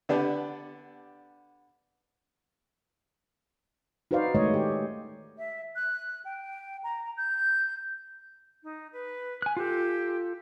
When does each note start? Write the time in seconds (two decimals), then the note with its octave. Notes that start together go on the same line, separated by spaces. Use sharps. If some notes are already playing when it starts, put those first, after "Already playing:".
0.09 D3 B3 D4 G4
4.11 D#4 F#4 B4 C5 D5 F5
4.35 D#3 G#3 A3 C#5 D#5
4.54 G4
5.38 E5
5.76 F#6
6.25 G5
6.84 A#5
7.17 G6
8.63 D#4
8.93 B4
9.42 G#5 F#6
9.57 F4 G4 A4